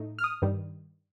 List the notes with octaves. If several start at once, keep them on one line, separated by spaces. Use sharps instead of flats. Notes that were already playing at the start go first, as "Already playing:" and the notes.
Already playing: A2 A3 D#4
F6
D#6
G2 D#3 G3